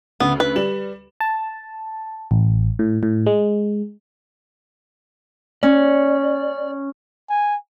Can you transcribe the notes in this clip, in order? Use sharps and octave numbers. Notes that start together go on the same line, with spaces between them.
D2 C#3 B3
B4
G3 E7 F#7
A5
A1
A2
A2
G#3
C#4 D5
G#5